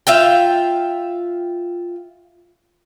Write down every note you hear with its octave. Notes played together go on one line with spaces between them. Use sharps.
F4 E5 F5 G5